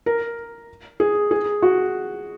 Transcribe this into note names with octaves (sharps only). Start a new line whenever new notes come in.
A#4
G#4
G#4
F#4